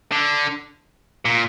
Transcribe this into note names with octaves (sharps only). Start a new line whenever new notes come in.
D3
A#2